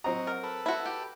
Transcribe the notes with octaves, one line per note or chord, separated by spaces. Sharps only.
F#3 C4 F#4 D#5 A#5
A#4
A4 B4
E4 F#4
G4